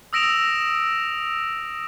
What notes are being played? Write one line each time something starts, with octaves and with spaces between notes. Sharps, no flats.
D#6 E6 A#6 D7 E7 F7